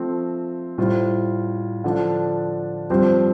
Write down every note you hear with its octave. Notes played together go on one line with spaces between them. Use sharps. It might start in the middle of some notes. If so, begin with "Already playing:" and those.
Already playing: F3 A3 C4
A2 G3 F4 C5
D3 F3 D4
G2 F3 C4 G4 C5